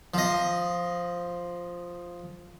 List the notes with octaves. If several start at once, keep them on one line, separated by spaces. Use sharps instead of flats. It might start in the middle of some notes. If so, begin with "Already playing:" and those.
F3 D#5